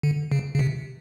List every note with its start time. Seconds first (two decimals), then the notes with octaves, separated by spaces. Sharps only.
0.03 D3
0.32 C#3
0.55 C#3
0.59 C3